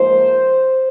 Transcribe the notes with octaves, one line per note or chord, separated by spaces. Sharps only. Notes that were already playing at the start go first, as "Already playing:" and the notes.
Already playing: G#2 F3 A#3 C5